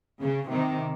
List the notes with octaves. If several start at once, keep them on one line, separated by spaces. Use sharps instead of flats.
C#3
C3 D#3